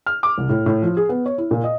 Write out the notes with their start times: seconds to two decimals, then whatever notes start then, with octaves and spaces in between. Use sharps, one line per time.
0.06 F6
0.23 D6
0.38 C2
0.49 A2
0.66 A2
0.82 F3
0.97 G#4
1.09 B3
1.26 C#5
1.38 E4
1.51 A#2
1.64 D#5